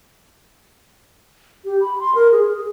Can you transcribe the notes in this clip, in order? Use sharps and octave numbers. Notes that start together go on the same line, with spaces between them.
G4
B5
C6
A#4
G#4
G#4